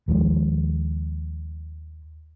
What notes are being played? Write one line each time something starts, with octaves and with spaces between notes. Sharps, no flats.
D#2 F3 G#3